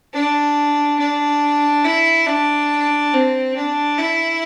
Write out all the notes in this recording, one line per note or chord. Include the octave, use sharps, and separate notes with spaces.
D4
D4
E4
D4
C4
D4
E4